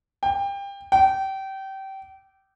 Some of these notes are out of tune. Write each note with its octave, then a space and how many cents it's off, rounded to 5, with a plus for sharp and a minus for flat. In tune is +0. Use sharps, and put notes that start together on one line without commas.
G5 +25
G5 -25